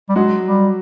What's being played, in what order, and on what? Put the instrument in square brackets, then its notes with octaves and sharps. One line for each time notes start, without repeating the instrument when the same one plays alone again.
[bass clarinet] G3
[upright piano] F#3 F#4 [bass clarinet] G#3
[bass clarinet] G3